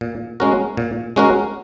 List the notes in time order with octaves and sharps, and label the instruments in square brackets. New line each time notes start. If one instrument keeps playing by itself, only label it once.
[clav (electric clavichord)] A#2
G#3 C#4 F#4 A#4
A#2
G#3 C#4 F#4 A#4